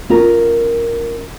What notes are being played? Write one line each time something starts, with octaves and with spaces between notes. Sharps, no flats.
C#4 F4 A#4